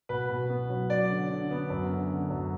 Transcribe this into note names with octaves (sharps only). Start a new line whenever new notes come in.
B2 B4
B2
B3
F#3
F#3 D5
D3
D3
B3
F#2
D3
D3
F#2